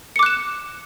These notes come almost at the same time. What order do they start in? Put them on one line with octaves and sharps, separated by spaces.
C#7 D6 F#6 E7